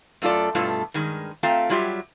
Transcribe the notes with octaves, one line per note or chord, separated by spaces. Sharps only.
F#2 A3 F4 A4 D5
G2 B2 A3 F4 A4
G2 D#3 G#3
A3 C4 F4 F5 G5 A#5
F#3 G3 F4 G4 E5